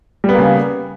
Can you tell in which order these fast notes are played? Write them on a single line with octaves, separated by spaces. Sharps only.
G3 B3 A#3 C#3